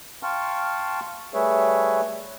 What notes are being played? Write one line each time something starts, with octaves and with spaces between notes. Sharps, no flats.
F5 G5 A5 C6 C#6 F6
G3 A3 G#4 B4 C#5 E5